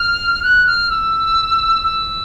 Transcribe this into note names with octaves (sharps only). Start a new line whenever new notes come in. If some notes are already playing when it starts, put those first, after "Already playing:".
Already playing: F6
F#6
F6
E6
E6